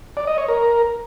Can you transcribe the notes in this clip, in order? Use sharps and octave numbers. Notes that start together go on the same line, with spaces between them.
D5
D#5
C#5
A#4